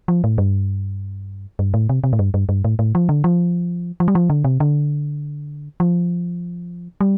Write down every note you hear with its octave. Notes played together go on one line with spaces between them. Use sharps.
F3
A2
G2
G2
A2
C3
C3
A2
G2
G2
G2
A2
A2
F3
D3
F3
F3
G3
F3
D3
C3
D3
F3
G3